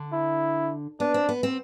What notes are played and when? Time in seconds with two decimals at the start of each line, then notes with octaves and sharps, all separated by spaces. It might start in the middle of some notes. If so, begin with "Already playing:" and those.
Already playing: D3
0.13 E4
1.00 B3 D4
1.14 C4
1.29 B3
1.43 C4